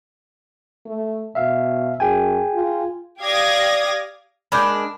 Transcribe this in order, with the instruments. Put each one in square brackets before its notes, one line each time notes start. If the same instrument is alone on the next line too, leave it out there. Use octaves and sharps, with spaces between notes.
[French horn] A3
[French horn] B2 [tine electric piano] E5 F5
[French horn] F#2 [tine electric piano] G#4 G5 G#5
[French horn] F4
[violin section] G4 D5 F5 D#6 G#6 A#6
[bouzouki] G#3 A#3 D4 [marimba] B5 D6 G6